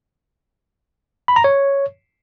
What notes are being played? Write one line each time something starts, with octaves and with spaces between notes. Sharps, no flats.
B5
A#5
C#5